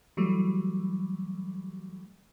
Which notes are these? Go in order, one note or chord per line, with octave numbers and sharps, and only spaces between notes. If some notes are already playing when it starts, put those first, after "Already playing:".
E3 F#3 G3 A3